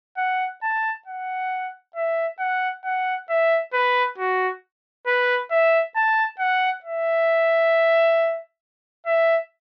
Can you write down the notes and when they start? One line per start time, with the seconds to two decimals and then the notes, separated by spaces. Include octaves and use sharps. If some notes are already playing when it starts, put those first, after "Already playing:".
0.18 F#5
0.63 A5
1.07 F#5
1.96 E5
2.40 F#5
2.85 F#5
3.29 E5
3.73 B4
4.18 F#4
5.07 B4
5.51 E5
5.96 A5
6.39 F#5
6.84 E5
9.06 E5